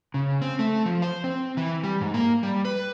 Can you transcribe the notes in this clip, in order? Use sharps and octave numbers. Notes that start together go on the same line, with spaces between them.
C#3
C4
A3
F3
C5
C4
E3
G3
G#2
A#3
G3
B4